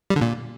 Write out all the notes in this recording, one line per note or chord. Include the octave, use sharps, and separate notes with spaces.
G3
D3
A#2